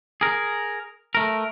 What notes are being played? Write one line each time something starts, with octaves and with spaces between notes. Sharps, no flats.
G#4 A#4
A3 A#4